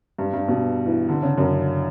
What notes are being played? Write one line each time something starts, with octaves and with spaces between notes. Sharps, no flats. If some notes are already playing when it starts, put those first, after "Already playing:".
G2
G2
B2
E3
D3
C#3
F#2